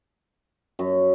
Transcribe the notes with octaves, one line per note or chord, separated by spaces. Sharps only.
F#2